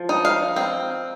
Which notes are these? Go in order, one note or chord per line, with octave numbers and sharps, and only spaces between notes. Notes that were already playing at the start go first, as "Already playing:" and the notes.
Already playing: F3
D#4
F5
C4